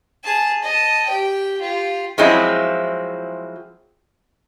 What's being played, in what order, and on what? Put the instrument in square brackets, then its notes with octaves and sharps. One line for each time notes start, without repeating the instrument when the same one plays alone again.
[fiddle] G#4 A5
D#5 A5
G4 G5
F4 G4
[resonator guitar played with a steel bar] F3 F#3 G#3 C4 E4